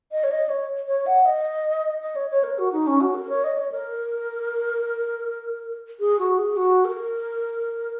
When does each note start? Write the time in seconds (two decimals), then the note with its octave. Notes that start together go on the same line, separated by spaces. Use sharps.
0.12 D#5
0.24 C#5
0.31 D#5
0.49 C#5
0.87 C#5
1.06 F#5
1.25 D#5
2.01 D#5
2.16 C#5
2.30 C#5
2.44 A#4
2.58 F#4
2.72 D#4
2.87 C#4
3.01 F#4
3.14 A#4
3.29 C#5
3.44 D#5
3.58 C#5
3.72 A#4
6.00 G#4
6.19 F#4
6.38 G#4
6.57 F#4
6.85 A#4